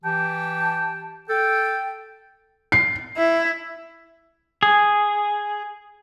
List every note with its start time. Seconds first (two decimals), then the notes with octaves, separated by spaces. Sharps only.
0.04 E3 G4 G5 A5
1.29 A4 G5
2.72 C7
3.17 E4
4.63 G#4